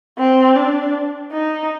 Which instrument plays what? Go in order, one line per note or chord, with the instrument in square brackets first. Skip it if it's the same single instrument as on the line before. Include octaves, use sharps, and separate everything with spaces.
[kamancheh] C4
D4
D#4